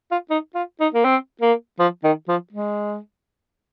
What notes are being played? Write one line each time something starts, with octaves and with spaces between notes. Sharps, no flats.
F4
D#4
F4
D#4
A#3
C4
A#3
F3
D#3
F3
G#3